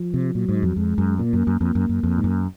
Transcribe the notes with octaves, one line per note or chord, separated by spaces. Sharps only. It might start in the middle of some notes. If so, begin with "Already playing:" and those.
Already playing: F3
C3
A#2 F#3
G#2
F2
F2 G#3
F#2
A#2 A#3
F#2
F#2
F2 A#3
F#2
F#2
F2
G#2
F#2